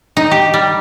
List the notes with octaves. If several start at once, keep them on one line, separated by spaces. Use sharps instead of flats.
D#4
G4
G3